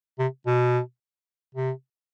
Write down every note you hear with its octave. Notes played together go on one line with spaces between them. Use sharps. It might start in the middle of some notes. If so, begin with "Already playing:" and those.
C3
B2
C3